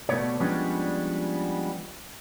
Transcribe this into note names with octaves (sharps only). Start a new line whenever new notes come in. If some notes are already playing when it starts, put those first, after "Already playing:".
B2 G#3 A3 B3 C#5 D5
F3 G3 G#3 B3 C#4 D4